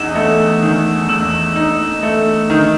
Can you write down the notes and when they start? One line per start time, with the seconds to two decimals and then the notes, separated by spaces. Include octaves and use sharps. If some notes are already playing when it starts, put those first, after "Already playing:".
Already playing: E2 D#4 E6 E7
0.15 A3
0.62 D#3
1.09 E2 E6 E7
1.56 D#4
2.03 A3
2.50 D#3